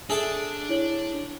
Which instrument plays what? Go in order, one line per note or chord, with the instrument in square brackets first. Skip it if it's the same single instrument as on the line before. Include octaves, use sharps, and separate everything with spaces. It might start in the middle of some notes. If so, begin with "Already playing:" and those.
[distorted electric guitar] D4 [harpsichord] G#4 A4 E5
[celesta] E4 C#5 F#7